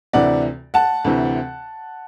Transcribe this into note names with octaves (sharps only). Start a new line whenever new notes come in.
D2 C3 E3 D5 F#5
F#5 A5
D2 C3 E3